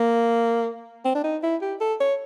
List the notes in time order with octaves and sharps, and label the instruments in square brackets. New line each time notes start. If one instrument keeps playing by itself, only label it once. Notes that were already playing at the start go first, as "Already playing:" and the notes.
Already playing: [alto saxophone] A#3
C4
D4
D#4
E4
G4
A4
C#5